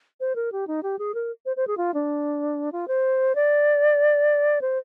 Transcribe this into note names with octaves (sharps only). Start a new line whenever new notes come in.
C5
A#4
G4
D#4
G4
G#4
A#4
C5
C5
G#4
F4
D4
F4
C5
D5
C5